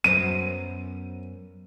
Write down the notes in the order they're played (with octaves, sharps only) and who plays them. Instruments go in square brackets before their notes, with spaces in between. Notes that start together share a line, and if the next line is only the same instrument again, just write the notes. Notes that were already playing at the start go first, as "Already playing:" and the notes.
[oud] F#2 B3 C5 [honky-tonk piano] D#7